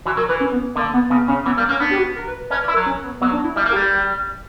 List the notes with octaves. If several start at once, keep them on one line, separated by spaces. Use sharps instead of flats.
E3 F#4
F#3 A#4
E3 B4
C#4
B3
D3 A#3
B3
C#3 B3
C#3 C#4
E3 B3
G3 A#3
A#3 C#4
B3 D4
G4
F#4
A#4
B4
C#4 B4
D5
E4
A#4
F#3
C#4
B3
F#3 B3
D4
E4
G3 E4
A#3 A#4
G3 G4